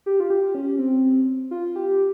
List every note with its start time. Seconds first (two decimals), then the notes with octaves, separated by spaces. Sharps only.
0.06 G4
0.20 F4
0.30 G4
0.55 C#4
0.79 C4
1.51 F4
1.76 G4